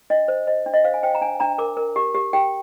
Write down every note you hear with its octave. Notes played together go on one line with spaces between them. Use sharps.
D4 D#5
C5
C5 D#5
D4
D#5
C5 F5
G#5
C5 G5
A#5
D4 G#5
D4 A#5
A#4 D6
A#4
G4
G4
G4 G5